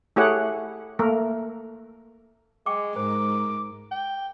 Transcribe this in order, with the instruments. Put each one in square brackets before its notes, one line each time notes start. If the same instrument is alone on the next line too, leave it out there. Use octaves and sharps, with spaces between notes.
[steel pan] A3 E4 G4 G#4 C#5 F#5
A3 A#3 A#4
[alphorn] G#3 [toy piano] G5 C#6 D6
[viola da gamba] G#2 [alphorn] A#4 [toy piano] C5 [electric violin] D6
[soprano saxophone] G5